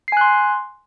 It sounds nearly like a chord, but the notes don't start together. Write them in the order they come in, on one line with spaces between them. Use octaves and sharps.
C7 G#5 F#6 C6